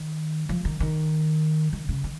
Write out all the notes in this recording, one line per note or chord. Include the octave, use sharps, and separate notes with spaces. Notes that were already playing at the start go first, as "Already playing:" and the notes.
Already playing: D#3
F3
D#3
D#3
D#3
C#3
D#3